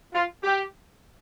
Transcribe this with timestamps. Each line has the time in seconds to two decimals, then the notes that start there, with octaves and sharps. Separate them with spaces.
0.14 F4
0.44 G4